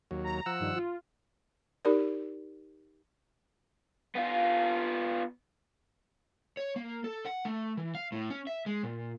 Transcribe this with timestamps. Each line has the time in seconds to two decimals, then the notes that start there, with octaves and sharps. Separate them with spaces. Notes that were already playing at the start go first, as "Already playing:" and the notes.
0.11 D#2 F#3
0.24 A#5
0.46 F3 F#5 E6
0.60 G2 D#3
0.75 F4
1.85 D#4 G4 A#4 D5
4.15 B3 F4
6.57 C#5
6.76 A#3
7.04 A4
7.25 F#5
7.45 A3
7.77 E3
7.95 F5
8.12 A2
8.30 C#4
8.47 E5
8.66 G#3
8.83 A#2